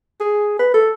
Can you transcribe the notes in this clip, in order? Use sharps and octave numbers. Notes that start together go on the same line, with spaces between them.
G#4
B4
A4